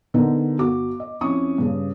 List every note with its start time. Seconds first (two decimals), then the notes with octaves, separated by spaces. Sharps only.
0.14 D3 B3 D#4 A#4
0.59 G1 F#4 D6
1.00 D#5
1.21 F2 C#4 E4 C#6 D#6
1.58 G2 C#3